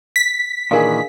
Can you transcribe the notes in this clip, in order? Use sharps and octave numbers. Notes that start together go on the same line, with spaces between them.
B6
A#2 D#3 E3 D4 G#4 A#4 D#5 F5